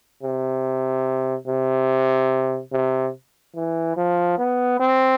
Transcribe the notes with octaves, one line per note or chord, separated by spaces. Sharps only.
C3
C3
C3
E3
F3
B3
C4